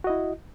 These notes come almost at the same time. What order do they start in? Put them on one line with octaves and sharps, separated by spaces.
F#4 D#5 E4